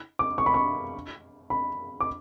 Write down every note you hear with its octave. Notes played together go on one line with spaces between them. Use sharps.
D6
C#6
B5
C#6
B5
D6